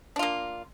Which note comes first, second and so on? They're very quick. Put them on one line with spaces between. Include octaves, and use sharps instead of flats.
D4 F4 A#3